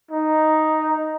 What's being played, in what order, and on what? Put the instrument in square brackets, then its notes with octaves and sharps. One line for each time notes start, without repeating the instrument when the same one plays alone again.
[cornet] D#4